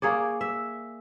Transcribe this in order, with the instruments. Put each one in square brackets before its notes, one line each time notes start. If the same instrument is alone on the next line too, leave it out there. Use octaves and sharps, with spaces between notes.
[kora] A#3 G#4 C#5 D5
E5